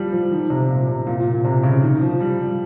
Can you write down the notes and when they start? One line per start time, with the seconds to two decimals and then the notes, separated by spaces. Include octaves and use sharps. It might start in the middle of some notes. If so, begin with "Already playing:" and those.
Already playing: F3 G3
0.12 F3
0.31 D#3
0.50 C3
0.68 A#2
0.88 C3
1.07 A#2
1.20 A#2
1.32 A#2
1.44 C3
1.63 C#3
1.82 D#3
2.01 F3
2.20 G3